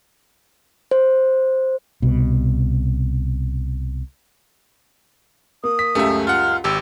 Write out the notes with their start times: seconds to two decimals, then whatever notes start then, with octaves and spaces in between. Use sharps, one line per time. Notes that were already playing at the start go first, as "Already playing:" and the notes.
0.91 C5
2.02 C2 B2
5.64 A#3 D#6
5.79 B6
5.95 C#2 F#2 A3 G4 E5
6.27 F4 F#5 F6
6.64 G#1 G4 E6